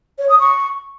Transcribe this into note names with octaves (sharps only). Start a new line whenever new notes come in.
C#5
D#6
C#6